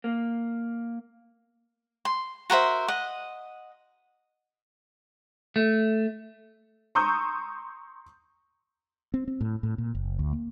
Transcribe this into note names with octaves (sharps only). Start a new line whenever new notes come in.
A#3
C6
F#4 A#4 C5 E5
D#5 F#5
A3
A#5 C6 C#6 D#6 E6 G6
C4
C4
A2
A2
A#2
F#1
D2
A#3